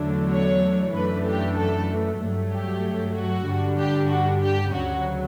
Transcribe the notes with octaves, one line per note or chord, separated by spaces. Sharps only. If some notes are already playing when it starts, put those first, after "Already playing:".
Already playing: E2 D3 F#3 A3 D4
C#5
F#2 E3 A3 D4 B4
G4
A4
G2 F#3 A3
G4
F#4
G2 D3 G3 D4
G4
F#4
G4
D2 C#3 F#3 F#4